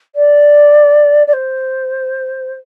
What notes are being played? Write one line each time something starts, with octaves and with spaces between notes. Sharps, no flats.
D5
D5
C5